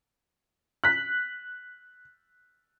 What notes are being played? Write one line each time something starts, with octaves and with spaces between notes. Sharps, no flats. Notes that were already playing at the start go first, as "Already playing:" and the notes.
F#6 B6